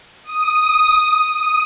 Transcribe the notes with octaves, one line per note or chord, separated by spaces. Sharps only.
D#6
D#6